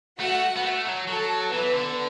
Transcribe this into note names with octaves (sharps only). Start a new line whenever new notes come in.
A3 F#4 F#5
B3
A3
F#3
F#3 A4 A5
E3 B3 B4
D3